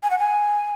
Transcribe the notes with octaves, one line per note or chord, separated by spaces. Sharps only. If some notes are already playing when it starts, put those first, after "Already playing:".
G#5
F#5
G#5